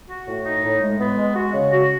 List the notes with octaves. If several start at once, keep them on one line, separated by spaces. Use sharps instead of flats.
F#4
A2
D#4
A2
G#3
B3
G#3
F#4
C#3
F#4